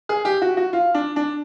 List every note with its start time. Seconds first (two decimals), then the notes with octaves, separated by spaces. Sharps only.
0.09 G#4
0.25 G4
0.42 F#4
0.57 F#4
0.73 F4
0.95 D4
1.16 D4